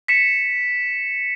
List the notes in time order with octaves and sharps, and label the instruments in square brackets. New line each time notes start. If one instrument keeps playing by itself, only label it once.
[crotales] B6 C#7 E7